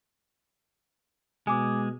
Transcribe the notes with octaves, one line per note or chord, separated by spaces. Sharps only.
B2 G#3 G#5 D6